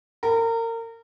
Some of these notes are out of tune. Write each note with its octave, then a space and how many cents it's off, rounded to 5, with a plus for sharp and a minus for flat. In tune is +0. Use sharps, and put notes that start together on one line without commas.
A#4 -30